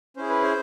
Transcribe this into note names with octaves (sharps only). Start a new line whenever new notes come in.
C#4 E4 G#4 C5
B4
C5